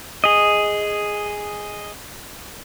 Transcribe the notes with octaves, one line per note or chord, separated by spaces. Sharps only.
G#4 D#5